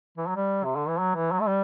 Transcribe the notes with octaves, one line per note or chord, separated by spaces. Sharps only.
E3
F#3
G3
C3
D3
E3
F#3
E3
F#3
A3
G3